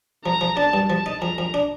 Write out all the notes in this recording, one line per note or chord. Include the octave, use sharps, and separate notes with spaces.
F3 A#5
F3
D4 A5
G2
F3 A5
D#4
F2 A#5
F2
D4